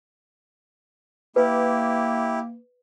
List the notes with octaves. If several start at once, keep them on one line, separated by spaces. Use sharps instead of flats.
A#3 E4 G4 B4